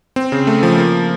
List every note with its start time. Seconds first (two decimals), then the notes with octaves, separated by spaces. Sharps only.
0.16 C4
0.32 C#3
0.47 A3
0.63 F3
0.78 A#3